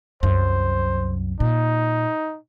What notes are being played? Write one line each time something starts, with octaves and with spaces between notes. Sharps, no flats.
C2 F#2 C5
A#2 D#4